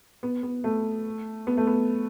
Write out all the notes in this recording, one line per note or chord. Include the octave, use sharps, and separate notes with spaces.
B3
B3
A3
B3
A3
B3